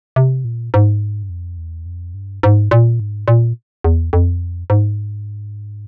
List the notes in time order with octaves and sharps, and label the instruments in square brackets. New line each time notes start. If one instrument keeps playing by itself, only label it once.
[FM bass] C3
A#2
G#2
G2
F2
E2
F2
G2
G#2
A#2
G#2
A#2
E2
F2
G#2